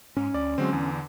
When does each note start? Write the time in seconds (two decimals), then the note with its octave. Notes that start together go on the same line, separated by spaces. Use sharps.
0.17 G#2 C#4
0.34 D2 D5
0.58 D3 F#3 G#3 C4
0.73 E2